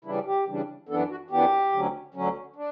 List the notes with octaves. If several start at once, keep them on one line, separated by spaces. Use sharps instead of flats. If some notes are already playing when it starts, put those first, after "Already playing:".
C#3 E3 G3 D4 E4
G4
C#3 E3 G3 D4
F#2 E3 B3 D4 A4
F#4
F#2 E3 B3 D4 G4
D2 D3 F#3 C#4
D2 D3 F#3 C#4
D4